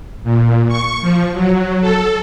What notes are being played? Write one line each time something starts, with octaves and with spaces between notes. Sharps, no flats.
A#2
C#6
F3
F#3
A4